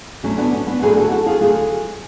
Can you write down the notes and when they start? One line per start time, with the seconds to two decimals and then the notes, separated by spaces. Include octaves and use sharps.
0.23 D2 D3 F#3 A3 C#4
0.38 B3 D4
0.53 C#4
0.67 B3 D4
0.82 D2 D3 F#3 A3 G#4 B4
0.97 F#4 A4
1.11 F#4 A4
1.26 F4 G#4
1.41 D2 D3 F#3 A3 F4 G#4